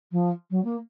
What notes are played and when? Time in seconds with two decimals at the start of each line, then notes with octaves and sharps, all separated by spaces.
0.12 F3
0.51 F#3
0.64 A#3